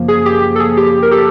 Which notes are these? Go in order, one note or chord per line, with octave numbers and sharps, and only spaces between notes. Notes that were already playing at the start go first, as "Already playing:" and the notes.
Already playing: F#2 C#3 F3 A#3
G#4
G4
A4
G#4
G4
A#4
G4 A4